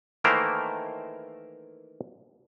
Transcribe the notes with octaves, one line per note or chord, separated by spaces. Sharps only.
D#3 E3 A3 A#3 A#4 C5